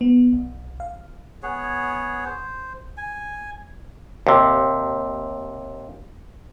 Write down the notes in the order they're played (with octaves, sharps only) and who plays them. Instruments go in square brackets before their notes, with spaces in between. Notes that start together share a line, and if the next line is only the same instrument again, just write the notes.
[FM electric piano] B3
B1
F5
[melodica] B3 G#4 C#5
C5
G#5
[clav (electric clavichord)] D#2 C3